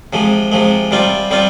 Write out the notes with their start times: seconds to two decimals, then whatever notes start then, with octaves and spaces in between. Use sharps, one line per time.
0.13 C3 F3 G#3
0.52 C3 F3 G#3
0.91 C3 G3 C4 F4
1.31 C3 G3 C4 F4